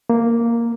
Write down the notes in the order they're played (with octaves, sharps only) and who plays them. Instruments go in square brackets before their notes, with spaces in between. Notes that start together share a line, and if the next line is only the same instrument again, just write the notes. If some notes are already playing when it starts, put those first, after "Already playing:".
[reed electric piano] A#3